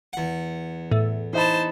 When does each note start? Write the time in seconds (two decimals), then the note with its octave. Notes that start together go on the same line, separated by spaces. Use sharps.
0.13 E2 F#5
0.92 A2
1.33 E3 D#4 C5 A5 B5